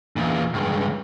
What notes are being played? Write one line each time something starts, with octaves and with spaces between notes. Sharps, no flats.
E2 A#2
C#2 G2